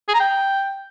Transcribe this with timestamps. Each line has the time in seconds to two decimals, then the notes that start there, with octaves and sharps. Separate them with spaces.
0.08 G#4
0.14 A#5
0.20 G5